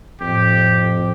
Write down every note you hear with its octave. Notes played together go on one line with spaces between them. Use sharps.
F2 A2 G4